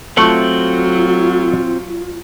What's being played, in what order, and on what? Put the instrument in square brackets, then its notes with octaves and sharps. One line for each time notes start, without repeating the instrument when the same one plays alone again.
[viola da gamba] F#3 [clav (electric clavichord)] A3 [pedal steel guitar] C4 F#5 [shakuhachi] F4